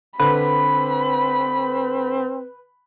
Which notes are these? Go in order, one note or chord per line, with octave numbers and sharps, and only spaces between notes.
D3 C4 B4 B5